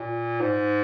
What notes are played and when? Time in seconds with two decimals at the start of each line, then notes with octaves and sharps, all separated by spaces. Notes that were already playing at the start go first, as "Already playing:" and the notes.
Already playing: A#2
0.41 G#2